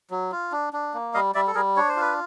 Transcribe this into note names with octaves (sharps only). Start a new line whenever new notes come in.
F#3
F4
D4
D4
A#3
G3 D#5 F5
G3 D5 E5
A4
G3 G#4 A#4
D4 C#5
C5
F4
B4